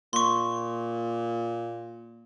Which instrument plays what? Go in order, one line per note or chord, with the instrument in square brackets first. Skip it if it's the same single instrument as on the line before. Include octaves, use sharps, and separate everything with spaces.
[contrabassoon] A#2 [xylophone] C6 C#6